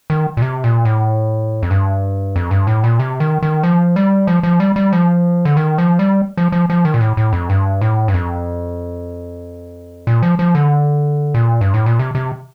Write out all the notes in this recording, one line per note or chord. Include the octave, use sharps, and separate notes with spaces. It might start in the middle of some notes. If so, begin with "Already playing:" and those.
D#3
A#2
C3
A#2
A2
F2
G2
F2
G2
A2
A#2
C3
D#3
D#3
F3
G3
F3
F3
G3
G3
F3
D3
D#3
F3
G3
F3
F3
F3
D#3
A#2
A2
A2
F2
G2
A2
G2
F2
A#2
F3
F3
D3
A#2
G2
A2
A#2
C3
C3